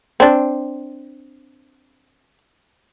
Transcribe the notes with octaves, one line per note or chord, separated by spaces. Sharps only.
C4 D4